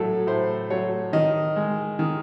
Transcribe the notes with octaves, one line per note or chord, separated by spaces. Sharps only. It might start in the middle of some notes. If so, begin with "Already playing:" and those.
Already playing: A2 F#3 A3 A4
A2 C5
F#3 A3 C#5
D#3 D#5
G#3
D#3